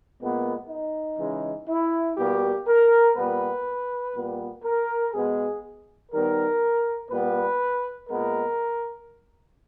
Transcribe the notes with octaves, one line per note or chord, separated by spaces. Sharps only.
A#2 G#3 B3
D#4
C#3 E3 G#3
E4
B2 G3 A#3 G4
A#4
A#2 G3 B3 B4
A#2 G3 B3
A#4
B2 G#3 B3 G#4
D#3 G3 B3 A#4
A#2 G3 B3 B4
A#2 G#3 B3 A#4